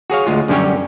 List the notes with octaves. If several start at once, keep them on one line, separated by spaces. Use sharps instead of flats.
F#4 G#4 C#5 F5
D2 G#3 F4
F#2 D3 G3 C#4 G4 C#5